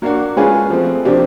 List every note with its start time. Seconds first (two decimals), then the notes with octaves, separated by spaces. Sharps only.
0.02 F#3 A#3 D4 F#4
0.37 G#3 C#4 F4 G#4 B4
0.70 F3 A3 C4
1.05 C3 F3 A#3 D4 G4